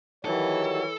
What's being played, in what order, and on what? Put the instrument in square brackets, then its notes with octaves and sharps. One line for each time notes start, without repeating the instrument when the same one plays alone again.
[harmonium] D#3 F#3 G3 [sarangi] E3 [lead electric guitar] A4 [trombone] C#5